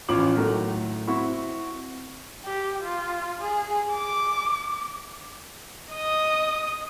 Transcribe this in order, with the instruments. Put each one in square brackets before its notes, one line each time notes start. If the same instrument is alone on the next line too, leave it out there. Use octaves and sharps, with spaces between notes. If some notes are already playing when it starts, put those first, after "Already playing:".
[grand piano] A1 F3 C#4 F4 D6 F#7
A2 D#3 F#3 A3
C4 E4 F#4 C#6
[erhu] G4
F4
G#4
D6
[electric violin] D#5 D#6